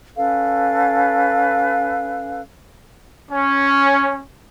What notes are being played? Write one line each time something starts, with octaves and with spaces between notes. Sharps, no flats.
C#4 A4 B4 F5
C#4